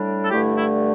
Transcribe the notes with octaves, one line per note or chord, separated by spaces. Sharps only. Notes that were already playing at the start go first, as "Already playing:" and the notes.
Already playing: A2 G3 D4
A4
G2 D3 A3 E4 G4
E4